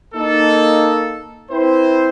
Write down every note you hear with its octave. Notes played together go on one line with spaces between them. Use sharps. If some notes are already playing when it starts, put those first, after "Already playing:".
A#3 D#4 A4
C4 E4 B4 C5